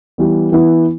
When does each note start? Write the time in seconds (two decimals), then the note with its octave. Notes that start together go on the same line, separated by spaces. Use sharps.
0.18 E3 G3 B3
0.52 E3 B3 E4